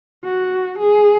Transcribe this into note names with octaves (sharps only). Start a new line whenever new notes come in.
F#4
G#4